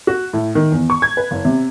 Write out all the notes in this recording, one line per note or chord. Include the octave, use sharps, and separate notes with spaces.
F#4
A2
D#3
E2
C#6
G#6
B4
F#1
C3